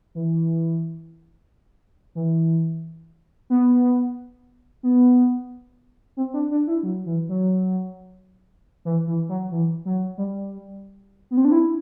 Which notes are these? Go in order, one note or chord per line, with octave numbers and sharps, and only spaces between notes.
E3
E3
B3
B3
C4
D4
D4
E4
F#3
E3
F#3
E3
E3
F#3
E3
F#3
G3
B3
C4
D4
E4